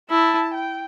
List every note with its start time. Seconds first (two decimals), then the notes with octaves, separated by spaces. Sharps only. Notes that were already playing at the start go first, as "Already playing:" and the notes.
0.10 E4 A5
0.54 G5